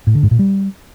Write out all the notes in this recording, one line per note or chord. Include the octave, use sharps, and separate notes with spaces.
A2
D3
G#2
A#2
G3